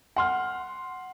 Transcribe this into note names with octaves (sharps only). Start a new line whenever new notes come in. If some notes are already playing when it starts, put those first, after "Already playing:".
F#5 C6 F6